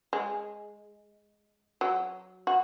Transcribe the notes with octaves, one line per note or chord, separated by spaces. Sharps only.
G#3
F#3
F#4